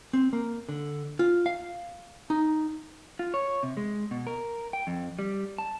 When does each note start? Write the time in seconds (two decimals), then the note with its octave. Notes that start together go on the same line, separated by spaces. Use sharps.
0.13 C4
0.33 A#3
0.69 D3
1.19 F4
1.46 F5
2.30 D#4
3.19 F4
3.34 C#5
3.63 C3
3.77 G#3
4.11 B2
4.27 A#4
4.73 G5
4.87 F2
5.19 G3
5.58 A5